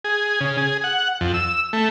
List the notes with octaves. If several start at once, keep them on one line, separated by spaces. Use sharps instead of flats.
G#4
C#3
G#4
F#5
F2
E6
A3